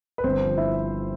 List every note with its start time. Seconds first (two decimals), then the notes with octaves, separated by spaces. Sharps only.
0.18 B4
0.24 G1 C4 C5
0.41 F3
0.58 E4 E5